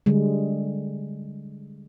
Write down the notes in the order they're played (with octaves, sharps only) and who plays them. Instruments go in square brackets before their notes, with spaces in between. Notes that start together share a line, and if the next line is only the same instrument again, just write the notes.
[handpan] D3 G3 G#3